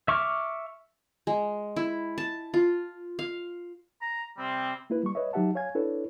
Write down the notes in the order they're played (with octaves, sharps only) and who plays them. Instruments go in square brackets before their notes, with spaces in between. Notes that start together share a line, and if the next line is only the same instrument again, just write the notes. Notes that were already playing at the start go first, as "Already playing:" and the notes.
[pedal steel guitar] E5 C#6 D6 F6
[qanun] G#3
E4
A5
F4
F5
[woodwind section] A#5
C3 G3 C4
[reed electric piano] A#3 E4 B4
G3 C#6
B4 C#5 D#5 E5
F#3 D#4 G4 E5 F#5 A5
C#5 F5 G#5 G#6
D4 E4 A4 B4 C#5